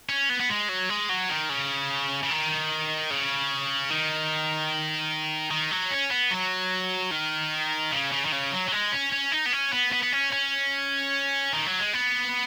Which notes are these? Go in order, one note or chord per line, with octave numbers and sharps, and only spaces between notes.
C#4
B3
B3
G#3
F#3
G#3
F#3
D#3
C#3
C#3
D#3
C#3
D#3
D#3
F#3
C#4
B3
F#3
D#3
C#3
C#3
D#3
C#3
F#3
F#3
G#3
C#4
C#4
D#4
B3
C#4
B3
B3
B3
C#4
C#4
D#3
F#3
G#3
B3